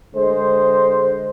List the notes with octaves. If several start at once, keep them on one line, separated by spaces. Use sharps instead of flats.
D3 G#3 C5